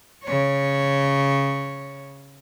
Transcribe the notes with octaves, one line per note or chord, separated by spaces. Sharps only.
C#3 C#5